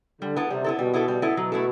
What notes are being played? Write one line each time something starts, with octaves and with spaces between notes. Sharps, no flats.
D3 G3
B3 E4 A4
C3 G3
B3 E4 A4
B2 G3
B3 E4 A4
G3
B3 E4 A4
B2 F#3
A3 E4 A4